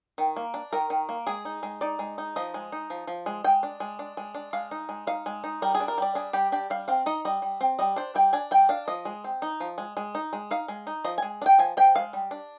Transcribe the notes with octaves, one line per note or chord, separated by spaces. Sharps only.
D#3
A#3
D4
D#3 A#4
D#3
A#3
G#3 G#4
D#4
G#3
D#4 D5
G#3
D#4
F3 D#5
G#3
D#4
F3
F3
G#3
G#3 G5
D4
G#3
D4
G#3
D4
G#3 F5
D#4
G#3
D#4 F5
G#3
D#4
G3 A#4
G#4
D4
A#4
G3 D5
D4 G#4
G3 G4
D4 G4
G3 F5
C4 F5
D#4 D#5
G3 D#5
G3
C4
G3 D#5
D4 C5
G3 G5
D4 G#5
G3 G5
D4 F5
F3 D#5
G#3
C4
D#4
F3
G#3
G#3
D#4
G#3
D#4 F5
G#3
D#4
F3 D#5
G#5
G#3
D4
G5
F3 G#5
F3 G5
G#3 F5
G3
D4